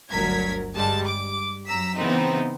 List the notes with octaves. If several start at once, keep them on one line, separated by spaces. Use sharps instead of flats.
G1 D2 F#3 A#4 G#6 B6
G2 G3 G#3 A5
D6
F#2 A#5 E6 B6
C#3 E3 B3 C4 D#4